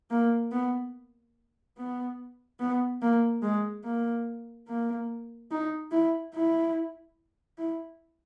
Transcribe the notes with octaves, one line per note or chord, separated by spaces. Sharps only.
A#3
B3
B3
B3
A#3
G#3
A#3
A#3
D#4
E4
E4
E4